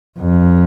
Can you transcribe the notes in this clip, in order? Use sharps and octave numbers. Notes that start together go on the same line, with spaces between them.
F2